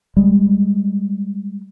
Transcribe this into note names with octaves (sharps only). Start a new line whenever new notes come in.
G3 G#3